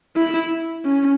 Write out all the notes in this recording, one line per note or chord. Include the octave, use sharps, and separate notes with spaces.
E4
C#4